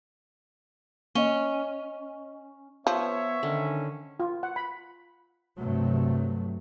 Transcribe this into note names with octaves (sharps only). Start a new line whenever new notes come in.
A#3 C#4 D#5 G7
F3 B3 C#5 E5
D3 D#3 C#4
F4
F#5
B5
G2 C3 F#3 A3